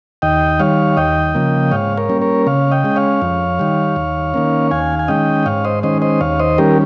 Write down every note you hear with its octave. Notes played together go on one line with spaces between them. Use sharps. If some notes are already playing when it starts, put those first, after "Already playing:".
D#2 D#5 G5
D#3 G3 C#5 F5
D#2 D#5 G5
C#3 F3 A#3
G#2 C#5 F5
A#4 C#5
G3 A#3 C#4
A#4 C#5
C#3 C#5 F5
D#5 G5
G#3 C#4
C#5 F5
F2
D#3 G3
D#2
D#3 A#3 C#4
D#2 F5 G#5
G#5
D#3 G#3 C#4 D#5 G5
G#2 C#5 F5
C5 D#5
D#3 G#3 C#4 C5 D#5
C5 D#5
D#2 C#5 F5
C5 D#5
D#3 G3 C#4 G4 A#4